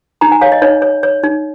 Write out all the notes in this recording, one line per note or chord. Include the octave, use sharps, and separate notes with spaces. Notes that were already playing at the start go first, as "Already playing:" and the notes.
D#4 A#5
G#5
C#5 F5
D#5
D#4 C#5
C#5
C#5
D#4